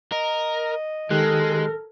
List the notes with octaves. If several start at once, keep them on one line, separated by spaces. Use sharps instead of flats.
A#4 D#5
D#3 G#3 G4 A4 A#4 F#6